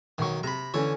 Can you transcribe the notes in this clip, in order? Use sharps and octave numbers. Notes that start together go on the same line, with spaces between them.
B1 D#3 F#3 C#6
C3 A#5 B5
D3 E3 C#4 C#5